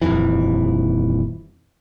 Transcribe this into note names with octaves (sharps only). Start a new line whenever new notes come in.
D#1 A1 F2 E3